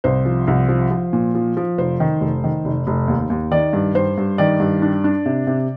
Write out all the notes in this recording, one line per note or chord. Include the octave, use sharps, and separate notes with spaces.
C2 C5
F3
C2
F3
F3
A#2
F3
F3
F1 C5
D#3
F1
D#3
F1
F1
D#2
D#2
D#3 D5
G2
G2 C5
G2
D#3 D5
G2
D4
D4
C3
C3